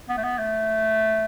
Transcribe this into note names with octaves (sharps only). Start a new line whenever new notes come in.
B3
A3
B3
A3